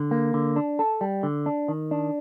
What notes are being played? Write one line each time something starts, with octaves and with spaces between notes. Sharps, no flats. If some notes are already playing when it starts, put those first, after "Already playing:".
Already playing: D3
A#3
D3
D4
A4
G3
D3
D4
D#3
D4